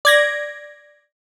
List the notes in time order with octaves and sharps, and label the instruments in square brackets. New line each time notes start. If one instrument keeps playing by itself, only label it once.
[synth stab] D5 G#6 A#6